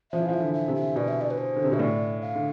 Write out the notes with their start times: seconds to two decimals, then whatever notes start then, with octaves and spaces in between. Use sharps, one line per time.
0.12 F3 E5
0.20 E3
0.26 F5
0.29 F3 E5
0.40 D3
0.54 E5
0.68 C3
0.75 E5
0.96 B2 D5
1.08 E5
1.21 D5
1.31 B4
1.38 C5
1.56 D3
1.64 C3
1.72 B2 E5
1.79 A2 D5
2.22 F5
2.35 D3